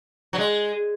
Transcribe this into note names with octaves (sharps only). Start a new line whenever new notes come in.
F#3
G#3